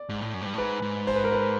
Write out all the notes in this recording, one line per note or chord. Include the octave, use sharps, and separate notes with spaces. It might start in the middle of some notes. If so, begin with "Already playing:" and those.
Already playing: D5
G#2
A2
F#2
G#2
G2
A2
G#2 B4
G#2
C5
B4
A#4
B4